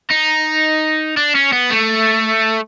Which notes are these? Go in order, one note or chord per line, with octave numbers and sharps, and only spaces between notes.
D#4
D4
C#4
B3
A3